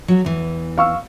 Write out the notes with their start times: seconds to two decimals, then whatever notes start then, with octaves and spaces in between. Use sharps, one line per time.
0.08 F#3 F#4
0.25 E2 E3
0.78 F5 C#6 E6